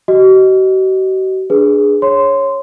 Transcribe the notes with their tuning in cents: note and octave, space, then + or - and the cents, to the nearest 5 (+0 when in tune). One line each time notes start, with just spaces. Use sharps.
F#4 +45 D#5 +0
D4 +0 G#4 +0 B4 -10
C#5 -15 C6 -15